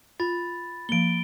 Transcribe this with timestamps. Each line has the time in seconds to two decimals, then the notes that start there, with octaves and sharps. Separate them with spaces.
0.20 F4 B5 A6
0.89 F3 A#3 D7 G7